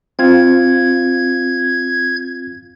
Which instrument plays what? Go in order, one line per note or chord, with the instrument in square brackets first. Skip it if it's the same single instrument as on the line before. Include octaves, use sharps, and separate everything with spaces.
[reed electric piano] C4 F4 F5 [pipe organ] G#6